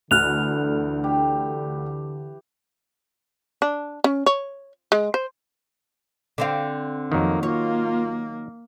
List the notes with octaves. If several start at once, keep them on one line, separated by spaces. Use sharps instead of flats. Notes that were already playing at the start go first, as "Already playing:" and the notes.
D2 D3 E3 F6 F#6 F7
G4
D4
C#4
C#5
G#3
C5
D3 C4 F5
F2 D#3 F#3 A#3
A#3 F4 C#5